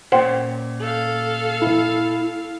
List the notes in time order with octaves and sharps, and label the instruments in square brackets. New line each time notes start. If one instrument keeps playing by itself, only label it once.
[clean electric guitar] A#2 C#4 [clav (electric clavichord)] C5 F#5 G5
[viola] A4 F5
[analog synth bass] E4